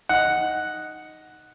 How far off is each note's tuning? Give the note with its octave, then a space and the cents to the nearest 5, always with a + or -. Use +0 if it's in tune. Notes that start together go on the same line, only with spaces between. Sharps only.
D#4 +0 F#5 +0